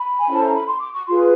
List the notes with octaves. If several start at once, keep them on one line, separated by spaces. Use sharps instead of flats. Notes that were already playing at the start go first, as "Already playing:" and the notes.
Already playing: B5
G#5
C#4 E4 A4 C5 A5
A#5
B5
C6
D6
C#6
F4 G#4 B4 C6